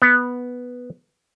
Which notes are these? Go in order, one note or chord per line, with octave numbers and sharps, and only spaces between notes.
B3